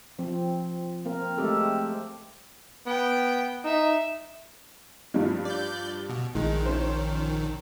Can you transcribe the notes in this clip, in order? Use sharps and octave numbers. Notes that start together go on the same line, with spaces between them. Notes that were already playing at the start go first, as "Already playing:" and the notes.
F3 C4
A#3 C4 A#4
G#3 A3 C4 G4 A4
B3 G5
D#4 E5
G2 F3 G3
D5 G6
B2
A#1 D#3 G#3
C#4 C5